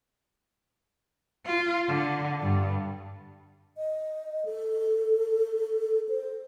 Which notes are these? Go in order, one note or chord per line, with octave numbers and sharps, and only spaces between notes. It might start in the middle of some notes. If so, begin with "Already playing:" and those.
F4
D3
G2
D#5
A4
C5